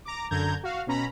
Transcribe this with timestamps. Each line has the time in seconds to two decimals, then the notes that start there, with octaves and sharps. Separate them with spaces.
0.05 A#5 D6
0.30 F#2 D3 A#5 G6 G#6
0.63 F#4 F5
0.87 B2 C#4 A#5 B5